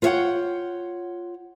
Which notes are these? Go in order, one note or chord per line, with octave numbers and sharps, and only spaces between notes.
F4 B4 C#5 E5 F#5 G5